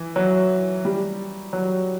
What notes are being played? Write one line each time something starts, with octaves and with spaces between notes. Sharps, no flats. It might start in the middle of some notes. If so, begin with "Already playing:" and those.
Already playing: E3
F#3
G3
F#3